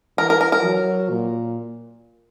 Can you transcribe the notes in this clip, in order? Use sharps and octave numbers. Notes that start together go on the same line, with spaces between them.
E3 A#4
A#4
A#4
A#4
F#3
A#2